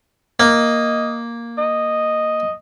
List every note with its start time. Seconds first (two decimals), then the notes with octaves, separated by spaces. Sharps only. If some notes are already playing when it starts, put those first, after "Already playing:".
0.40 A#3 D#5
1.58 D#5